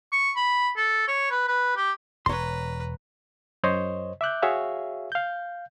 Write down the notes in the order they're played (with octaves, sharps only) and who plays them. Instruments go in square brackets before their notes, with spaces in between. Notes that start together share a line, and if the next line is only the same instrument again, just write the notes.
[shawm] C#6
B5
A4
C#5
B4
B4
G4
[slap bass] E1 [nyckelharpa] B4 A#5 [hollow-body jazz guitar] C#5 C6
[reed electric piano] F#2 C5 C#5 D#5
E5 D6 F#6 G6
F#4 G#4 C#5 E5 F5
F5 G6